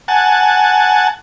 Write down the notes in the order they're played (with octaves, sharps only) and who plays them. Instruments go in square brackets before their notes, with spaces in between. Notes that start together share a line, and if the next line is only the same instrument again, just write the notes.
[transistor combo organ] F#5 G#5 A5